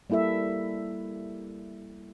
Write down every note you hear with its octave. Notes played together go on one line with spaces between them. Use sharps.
G3 A#3 E4 A4 E5